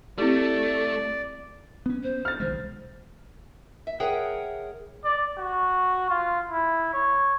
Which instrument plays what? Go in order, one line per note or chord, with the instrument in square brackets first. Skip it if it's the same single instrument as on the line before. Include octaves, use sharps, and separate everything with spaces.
[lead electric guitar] A3 [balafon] C4 E4 G4 [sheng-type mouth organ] D5
[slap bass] B3 C#4
[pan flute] C5
[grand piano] F6 A6
[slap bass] B1 D#3 G#3
[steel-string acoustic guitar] E5
G#4 A#4 C#5 E5 F#5 G5
[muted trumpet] D5
F#4
F4
E4
C#5